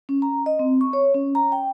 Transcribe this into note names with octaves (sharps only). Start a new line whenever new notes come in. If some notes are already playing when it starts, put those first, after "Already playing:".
C#4
A#5
D#5
C4
C#6
C#5
C#4
A#5
G5